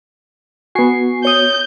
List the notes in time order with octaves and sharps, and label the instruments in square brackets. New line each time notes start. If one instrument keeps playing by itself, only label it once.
[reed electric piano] B3 F#4 [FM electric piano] G#5 C#6 C7
[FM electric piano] C#5 D#6 [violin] G6